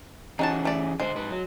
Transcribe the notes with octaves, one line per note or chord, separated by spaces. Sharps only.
E3 C#4 D#4 F#4 G#4 A5
A3 D5
D3 G#3 C5
G#2 B4
F#3